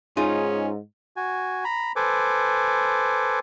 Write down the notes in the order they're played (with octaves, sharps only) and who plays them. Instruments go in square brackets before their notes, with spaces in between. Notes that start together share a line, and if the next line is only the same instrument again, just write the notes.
[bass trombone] G#2 [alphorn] C#4 [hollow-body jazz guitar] D#4 F4 [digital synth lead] G#4
[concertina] F#4 G#5
A#5 B5
A4 B4 C5 G#5 D6